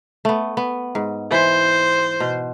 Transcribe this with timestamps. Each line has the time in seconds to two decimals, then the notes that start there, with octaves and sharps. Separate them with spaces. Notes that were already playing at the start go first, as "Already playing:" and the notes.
0.25 A3 B3
0.57 B3
0.95 G#2
1.32 E3 C5
2.20 B2